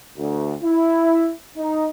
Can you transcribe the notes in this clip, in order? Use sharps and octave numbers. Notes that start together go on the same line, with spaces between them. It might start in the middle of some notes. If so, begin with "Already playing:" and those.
D2
E4
D#4